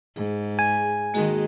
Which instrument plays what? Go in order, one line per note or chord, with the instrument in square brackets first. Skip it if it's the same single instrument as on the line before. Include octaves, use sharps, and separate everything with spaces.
[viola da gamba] G#2 [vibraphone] G#4
[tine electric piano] G#5
[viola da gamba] D#3 G#3 [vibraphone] A#3 F#4 G#4